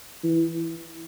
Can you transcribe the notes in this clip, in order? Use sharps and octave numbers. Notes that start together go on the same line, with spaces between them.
E3